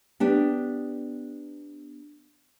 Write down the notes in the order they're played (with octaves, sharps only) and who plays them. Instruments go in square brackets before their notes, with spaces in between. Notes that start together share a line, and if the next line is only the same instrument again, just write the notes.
[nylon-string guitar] B3 D4 G4